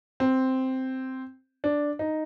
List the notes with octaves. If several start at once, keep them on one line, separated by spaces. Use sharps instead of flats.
C4
D4
D#4